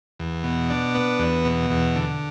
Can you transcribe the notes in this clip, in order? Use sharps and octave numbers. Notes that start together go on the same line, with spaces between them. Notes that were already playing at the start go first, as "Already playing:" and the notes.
E2
B2
D4
B3
E2
B2
E2
D3